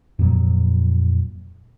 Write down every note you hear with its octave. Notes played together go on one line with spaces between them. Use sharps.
F2 A#2 F#3